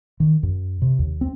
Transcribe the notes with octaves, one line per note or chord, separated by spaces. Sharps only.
D#3
F#2
C3
D#2
C4